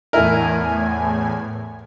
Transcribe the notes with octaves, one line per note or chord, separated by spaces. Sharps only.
E2 A2 E4 A#4 G#5